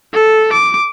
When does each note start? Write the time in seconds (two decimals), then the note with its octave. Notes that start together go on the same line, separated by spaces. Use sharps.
0.13 A4
0.53 D6